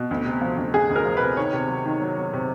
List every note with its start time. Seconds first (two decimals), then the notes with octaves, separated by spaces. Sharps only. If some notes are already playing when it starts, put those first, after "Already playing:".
Already playing: B2
0.11 D2
0.25 C3
0.41 F3
0.58 D2
0.74 D2 G#4
0.90 D2
0.96 A#4
1.05 F3
1.17 B4
1.21 C3
1.37 D#3 C#5
1.53 C3
1.69 F#3
1.86 D#3
2.02 F#3
2.17 F#3
2.34 C3